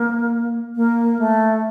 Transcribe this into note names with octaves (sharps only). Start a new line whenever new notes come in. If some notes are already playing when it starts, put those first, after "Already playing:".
Already playing: A#3
A#3
A3